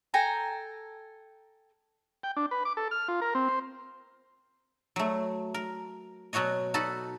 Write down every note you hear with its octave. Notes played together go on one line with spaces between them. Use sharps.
A4 G5 G#5 A#5
G5
D4
B4
D6
A4
F6
F4
A#4
C4
C5
F#3 A3
A#4
B2 F#3 F#4 C#5 D#5
D#4 F#4 A4 B4